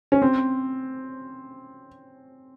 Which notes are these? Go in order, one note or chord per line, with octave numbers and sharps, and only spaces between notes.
C#4
C4